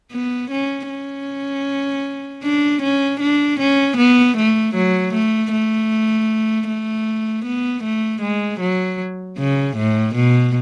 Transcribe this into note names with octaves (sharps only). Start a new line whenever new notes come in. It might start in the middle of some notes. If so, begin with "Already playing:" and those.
B3
C#4
C#4
D4
C#4
D4
C#4
B3
A3
F#3
A3
A3
A3
B3
A3
G#3
F#3
C#3
A2
B2